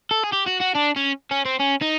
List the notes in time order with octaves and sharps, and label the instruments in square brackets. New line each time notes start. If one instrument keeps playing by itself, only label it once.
[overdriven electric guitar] A4
G#4
G4
F#4
F#4
D4
C#4
C#4
C4
C#4
D#4